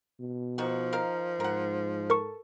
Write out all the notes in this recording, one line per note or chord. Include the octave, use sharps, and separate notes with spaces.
B2
D#3 F3 D#4 F#4
D#3 A#4 F5
G#2 A#4 F#5
A4 A#4 C#6